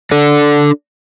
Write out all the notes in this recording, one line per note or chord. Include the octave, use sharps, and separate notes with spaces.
D4 A4 D5